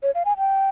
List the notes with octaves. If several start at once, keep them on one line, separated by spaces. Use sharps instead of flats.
C#5
F5
G#5
G5